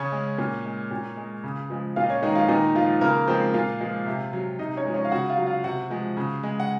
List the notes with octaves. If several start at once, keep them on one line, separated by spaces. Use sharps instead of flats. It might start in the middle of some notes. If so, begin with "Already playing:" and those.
Already playing: C#3 C#4 C#5
G#3
A#2
G#3
A#2
G#3
C#3
F3 G#3
A#2 F4 F5
D#5
C#4 C#5
D#3 G#3 D#4
F3 F4
A#2 D#3 D#4
F3 G#3 F4
C#3 A#3 A#4
F3 G#3 C4 C5
A#2 F4 F5
F3 G#3
C3
F#3
C3 D#4 D#5
C#4 C#5
F3 G#3
C#4 C#5
F5
C#3 F#4 F#5
F4 F5
F#3
F4 F5
C3 F#4 F#5
F3 G#3
C#3
G#3
F#5